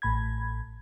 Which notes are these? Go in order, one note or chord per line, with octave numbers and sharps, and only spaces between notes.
A1 A2 B5 G#6